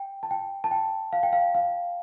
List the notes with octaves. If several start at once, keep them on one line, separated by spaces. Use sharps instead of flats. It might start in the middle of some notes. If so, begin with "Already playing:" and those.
Already playing: G5
A5
G5
A5
G5
F5
G5
F5
F5